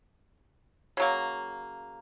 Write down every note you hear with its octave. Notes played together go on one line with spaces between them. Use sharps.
C#3 F#3 A#3